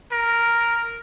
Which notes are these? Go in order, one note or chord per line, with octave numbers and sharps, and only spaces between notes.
A#4